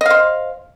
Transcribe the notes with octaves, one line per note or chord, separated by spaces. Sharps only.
C5 D#5 F5